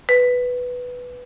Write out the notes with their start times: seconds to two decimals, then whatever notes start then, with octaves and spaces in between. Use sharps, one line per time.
0.09 B4